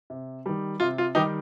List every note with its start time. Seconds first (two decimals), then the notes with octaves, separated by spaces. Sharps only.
0.10 C3
0.46 D#3 G3
0.80 C3 F4
0.98 F4
1.15 D#3 G3 D#4 G4